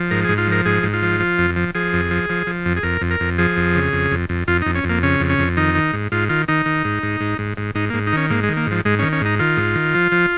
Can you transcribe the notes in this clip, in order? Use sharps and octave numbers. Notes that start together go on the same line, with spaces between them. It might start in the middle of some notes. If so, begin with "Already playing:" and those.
Already playing: F3
G#2 A#4
G#2 G#4
F4
F3 A#4
G#2 G#4
G#2
F4
F3
F3
F2
F3
F3 G#4
F2
F3
F3
F3
F2
G#4
F2 A#4
F2
A#4
F2
F3 G#4
F2
C#3
F2
F2
F2
F2 F4
F2 D#4
C#4
F2
A#3
C#3 C#4
F2
C#4
F2
D#3 D#4
D#3
G#2
G#2 F4
D#3 F4
D#3 D#4
D#3
G#2
G#2
G#2
G#2
G#2
G#2 D#4
G#2 A#3
D#4
D#3 C#4
G#2 A#3
G#3
D#3
A#3
G#2 F3
G#2 G#3
D#3 C#4
C#4
G#2 D#4
D#3 F4
G#2
D#3
F3
F3